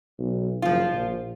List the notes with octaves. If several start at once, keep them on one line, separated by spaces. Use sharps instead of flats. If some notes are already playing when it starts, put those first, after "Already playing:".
B1
F#1 F3 F4
A#1